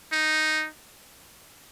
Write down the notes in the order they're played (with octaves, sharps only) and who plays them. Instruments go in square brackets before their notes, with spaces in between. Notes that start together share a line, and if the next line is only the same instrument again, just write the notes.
[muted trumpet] D#4